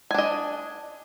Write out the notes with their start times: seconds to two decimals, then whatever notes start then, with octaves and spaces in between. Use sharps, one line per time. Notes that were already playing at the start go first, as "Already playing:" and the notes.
0.11 G#5
0.14 D4
0.18 D#5